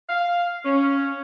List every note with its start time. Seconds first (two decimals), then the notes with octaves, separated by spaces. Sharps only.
0.09 F5
0.65 C#4